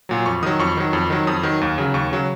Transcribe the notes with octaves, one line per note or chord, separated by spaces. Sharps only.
A#2 F#3
F2 C#6
D#3 F#3 D#6
F2 C#6
D#3 F#3
F2
D#3 F#3
F2 D#6
D#3 F#3
D#2
C#3 F#3
D#2 C#6
C#3 F#3